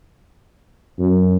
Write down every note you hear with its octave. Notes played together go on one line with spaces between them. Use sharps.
F#2